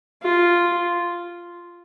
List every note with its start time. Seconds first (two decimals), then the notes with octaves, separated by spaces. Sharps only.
0.22 F4